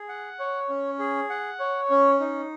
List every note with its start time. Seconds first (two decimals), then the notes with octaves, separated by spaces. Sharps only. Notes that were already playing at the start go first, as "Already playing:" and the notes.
Already playing: G#4
0.09 F#5
0.39 C#5
0.69 C#4
0.99 G#4
1.30 F#5
1.60 C#5
1.90 C#4
2.20 D#4